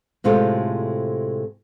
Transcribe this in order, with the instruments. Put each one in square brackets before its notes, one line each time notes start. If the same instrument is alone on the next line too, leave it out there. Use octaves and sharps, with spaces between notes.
[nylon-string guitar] A2 C3 G#3 F4 G4 A4